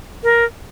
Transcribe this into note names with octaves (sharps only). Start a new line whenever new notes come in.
A#4